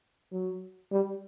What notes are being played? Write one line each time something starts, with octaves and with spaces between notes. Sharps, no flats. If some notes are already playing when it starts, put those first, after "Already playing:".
F#3
G3